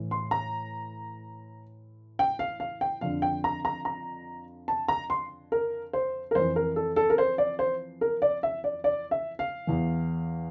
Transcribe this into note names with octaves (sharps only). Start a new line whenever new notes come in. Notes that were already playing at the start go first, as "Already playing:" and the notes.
Already playing: A2 E3
C6
A#5
G5
F5
F5
G5
F2 D3 F3 F5
G5
A#5
A#5
A#5
A5
A#5
C6
A#4
C5
A#4
F2 E3 C5
A#4
A4
A4
A#4
C5
D5
C5
A#4
D5
E5
D5
D5
E5
F5
E2 E3